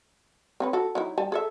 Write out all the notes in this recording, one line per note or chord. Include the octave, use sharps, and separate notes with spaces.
C4 C#4 B4
F#4 A4
F#3 D#4 E4
G3 G#5 A5
G#4 A4 E5